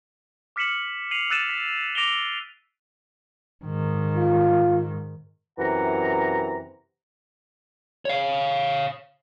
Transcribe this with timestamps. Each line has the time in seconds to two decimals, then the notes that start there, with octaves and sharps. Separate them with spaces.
0.56 D6 F6 B6 C#7 E7 F#7
1.11 C7 D#7 F7 F#7
1.30 E6 F#6 A6 D#7 E7
1.50 B6
1.95 D6 A#6 D7 E7 F7 G7
3.65 G#2 D#3
4.16 F4
5.58 F#2 C3 E3 F#5 A#5
8.05 C#5 F5